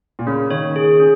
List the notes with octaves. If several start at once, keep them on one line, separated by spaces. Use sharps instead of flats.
A#2
C#3 A#3
D#3 C#5
G#4
C#4